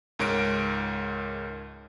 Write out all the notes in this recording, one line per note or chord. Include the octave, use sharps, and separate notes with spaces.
C#2 G#2 A#4 C#5 D7